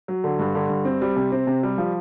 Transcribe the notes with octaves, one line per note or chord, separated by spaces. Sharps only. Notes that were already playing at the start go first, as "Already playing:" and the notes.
F#3
D3
G2
D3
G2
C4
G3
C3
C4
C3
G3
F3